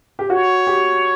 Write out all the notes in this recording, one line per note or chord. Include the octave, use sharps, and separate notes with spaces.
G4
F#4 C#5
G4